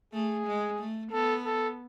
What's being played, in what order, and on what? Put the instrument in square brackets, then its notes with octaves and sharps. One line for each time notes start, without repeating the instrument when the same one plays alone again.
[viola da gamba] A3 [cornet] G#4
[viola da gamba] G#3
A3
[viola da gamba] B3 [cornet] A4
[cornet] A4